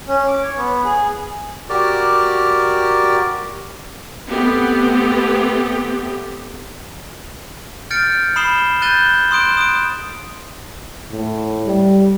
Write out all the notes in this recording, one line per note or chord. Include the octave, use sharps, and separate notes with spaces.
C#4
D6
C#5
B3
G#4
F#4 G4 A#4 D5
A3 B3 C4 G4
F6 G6 A6 C#7 D7
B5 D#6 C7 E7 G7
F#6 G6 A6 D#7 G7
C6 D#6 F#6 D7 E7
D#6 F#6 D7
A2
G3